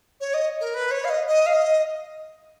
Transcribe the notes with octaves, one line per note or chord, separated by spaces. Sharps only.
C#5
D#5
A#4
B4
C#5
F5
D#5
D#5
F5
D#5